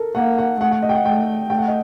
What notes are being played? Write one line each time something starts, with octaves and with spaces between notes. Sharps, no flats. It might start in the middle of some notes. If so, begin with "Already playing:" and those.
Already playing: A4 A#4
A#3 F#5
F#5
A3 F#5
F#5
D#5
G5
F#5
A3 G5
A3 G5
F#5
D#5